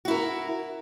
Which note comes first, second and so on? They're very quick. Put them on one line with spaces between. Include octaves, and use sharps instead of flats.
F#4 E4 A#4